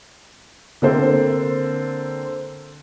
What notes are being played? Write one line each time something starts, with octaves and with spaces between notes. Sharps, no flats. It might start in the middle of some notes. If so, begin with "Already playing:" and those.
D3 A#3 C4 A4 C5